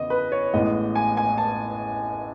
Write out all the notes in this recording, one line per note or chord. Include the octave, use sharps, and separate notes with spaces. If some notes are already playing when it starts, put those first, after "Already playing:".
Already playing: E2 C#3 D#5
B4
C#5
A1 A2 G#3 B3 D#5
G#5
G#5
A5